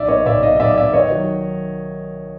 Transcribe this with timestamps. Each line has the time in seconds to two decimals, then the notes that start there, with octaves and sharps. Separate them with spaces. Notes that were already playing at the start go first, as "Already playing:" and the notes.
Already playing: B1 D5 E5
0.09 B2 C#5 D#5
0.26 B1 D5 E5
0.42 B2 D#5 F5
0.56 D#5
0.60 B1 D5 E5
0.76 B1 D5 E5
0.93 D#3 C#5 D#5
1.11 F#3